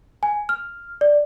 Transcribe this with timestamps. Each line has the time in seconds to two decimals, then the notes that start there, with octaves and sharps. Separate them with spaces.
0.23 G#5
0.49 F6
1.01 D5